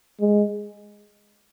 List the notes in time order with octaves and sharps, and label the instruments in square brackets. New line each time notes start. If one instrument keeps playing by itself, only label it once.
[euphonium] G#3